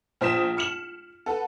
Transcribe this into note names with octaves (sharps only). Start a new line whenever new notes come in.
A#1 C5 D#6 B6 E7
F6 C#7 E7 F#7
A4 B4 F#5